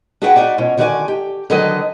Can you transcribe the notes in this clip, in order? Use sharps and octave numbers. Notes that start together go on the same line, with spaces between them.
D4 F#4 G#4 B4 F#5 G5
B3 D#4 F#4 D5
B2 C#4 F4
D3 D#3 F#4 C5 D5 G#5
G4
D3 D#3 F#3 A4 B4 D#5